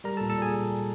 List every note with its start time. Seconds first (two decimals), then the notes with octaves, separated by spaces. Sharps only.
0.04 G3 A#4 A#5
0.17 A4 A5
0.21 A#2
0.30 A4 A5
0.38 A#2 G#4 G#5